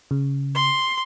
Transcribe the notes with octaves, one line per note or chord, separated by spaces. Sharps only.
C#3
C6